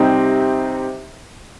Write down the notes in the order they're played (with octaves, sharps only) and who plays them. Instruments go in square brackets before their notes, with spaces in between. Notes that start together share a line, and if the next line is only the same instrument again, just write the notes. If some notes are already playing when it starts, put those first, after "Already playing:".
Already playing: [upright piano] C3 G3 C4 D#4